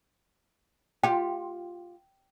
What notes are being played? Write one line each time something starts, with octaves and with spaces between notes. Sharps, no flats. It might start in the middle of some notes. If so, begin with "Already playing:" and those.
F4 G4 G5